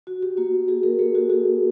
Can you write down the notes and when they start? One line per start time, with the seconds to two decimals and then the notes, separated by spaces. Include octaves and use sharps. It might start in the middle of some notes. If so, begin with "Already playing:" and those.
0.07 F#4
0.22 G4
0.37 A#3 F#4
0.68 F#4 G#4
0.83 G#4 A#4
0.99 A#3 G4 A4
1.15 F#4 G#4
1.29 F#4 G#4